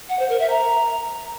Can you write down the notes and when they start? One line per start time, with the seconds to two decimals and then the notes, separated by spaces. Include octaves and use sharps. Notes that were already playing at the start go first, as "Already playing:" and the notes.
0.09 F#5
0.19 C5
0.29 A#4
0.40 E5
0.50 A#5